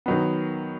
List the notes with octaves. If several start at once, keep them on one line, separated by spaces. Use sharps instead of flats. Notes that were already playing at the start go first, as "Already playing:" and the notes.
D#3 F#3 B3